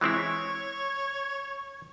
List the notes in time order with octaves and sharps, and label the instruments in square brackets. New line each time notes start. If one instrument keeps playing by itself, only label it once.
[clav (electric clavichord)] E3 G#3 C4 E4 [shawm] C#5